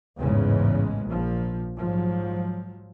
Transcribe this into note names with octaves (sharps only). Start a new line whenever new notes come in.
A1 E2 G#2 C#3 G#3
A#1 F3
G#2 F3 F#3